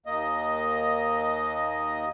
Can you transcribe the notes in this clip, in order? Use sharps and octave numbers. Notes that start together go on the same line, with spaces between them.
D#2 A#3 D#5